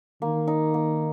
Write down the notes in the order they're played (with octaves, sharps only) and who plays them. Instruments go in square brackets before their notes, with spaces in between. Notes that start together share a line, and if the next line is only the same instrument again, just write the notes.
[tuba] D#3 [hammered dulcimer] A#3
[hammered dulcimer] D#4
A#3